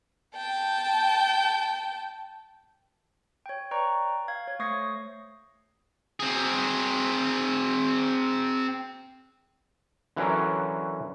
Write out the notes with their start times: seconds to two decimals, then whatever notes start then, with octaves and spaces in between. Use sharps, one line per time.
0.36 G5 A5
3.46 C#5 G5
3.71 B4 D5 G5 A#5 C#6
4.28 F5 G#6
4.48 C#5
4.59 A3 C5 C#6 D#6 A#6 C7
6.20 C4 G#4
10.16 D3 E3 F#3 C#4 A#4